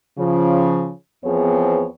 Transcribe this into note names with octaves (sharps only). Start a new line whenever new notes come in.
C#3 F3
E2 F3 B3 C4 G#4 C#5